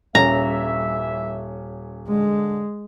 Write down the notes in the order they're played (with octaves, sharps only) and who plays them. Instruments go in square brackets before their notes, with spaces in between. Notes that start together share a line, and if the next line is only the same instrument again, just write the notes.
[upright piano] D#1 C#4 [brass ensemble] G2 E3 E5 [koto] A#5
[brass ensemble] D3 [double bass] G#3